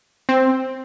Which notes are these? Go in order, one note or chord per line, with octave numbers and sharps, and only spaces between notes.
C4